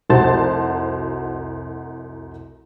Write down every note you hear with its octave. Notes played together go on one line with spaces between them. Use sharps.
F1 C2 F#4 C5 A5 A6